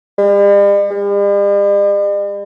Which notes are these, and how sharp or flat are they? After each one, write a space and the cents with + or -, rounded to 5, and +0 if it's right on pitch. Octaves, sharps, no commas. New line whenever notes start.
G3 +45
G3 +45